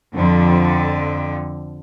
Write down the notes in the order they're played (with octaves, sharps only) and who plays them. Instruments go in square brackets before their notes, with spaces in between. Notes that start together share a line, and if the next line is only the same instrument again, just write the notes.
[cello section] F2 D3